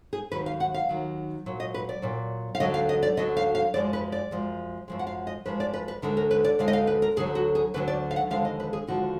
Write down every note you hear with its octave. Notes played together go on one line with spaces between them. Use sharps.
G#4
D#2 D#3 F#3 B4
F5
F#5
F5
D#2 D#3 F#3
A#2 F#3
D#5
B4
D5
A#2 F#3
F5
D2 D3 F#3 D#5
F5
D#5
D5
D2 D3 F#3 D#5
F5
F5
F#2 F3 G#3 D5
B4
D5
F#2 F3 G#3
F#2 F3 G#3
F#5
F5
D#5
F#2 F3 G#3 B4
D5
B4
B4
D2 D3 G#3 A#4
A#4
B4
D5
D2 D3 G#3 F5
D#5
F5
B4
A#4
D2 D3 F#3 G#4
F#4
G#4
D2 D3 F#3 B4
D5
F5
F#5
D#2 D3 F3 G#3 F5
D#5
B4
G#4
D#2 D3 F3 G#3 F#4